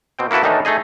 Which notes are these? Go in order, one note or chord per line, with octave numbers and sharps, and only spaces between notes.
B2 C4 G5
A#3 E4 F#4 A4 B4
A2 D#3 E3 D4 D#4 A4
A3 D#4 G#4 D#5